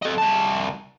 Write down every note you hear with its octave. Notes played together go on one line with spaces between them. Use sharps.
A4 D#5
C2 A5